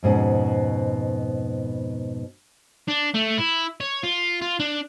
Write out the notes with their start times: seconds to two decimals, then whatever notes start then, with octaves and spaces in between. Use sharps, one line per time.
0.03 F2 G#2 B2 C#4
2.88 D4
3.15 A3
3.38 E4
3.80 C#5
4.03 F4
4.42 F4
4.60 D4